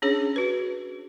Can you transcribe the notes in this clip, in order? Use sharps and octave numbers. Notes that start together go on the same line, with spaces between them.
C#4 D4 G#4 C#5
F#4 B4